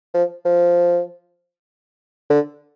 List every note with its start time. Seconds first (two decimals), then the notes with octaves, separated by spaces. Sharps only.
0.14 F3
0.45 F3
2.30 D3